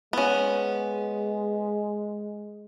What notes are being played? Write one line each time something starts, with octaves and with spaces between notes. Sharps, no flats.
G#3 B3 C#4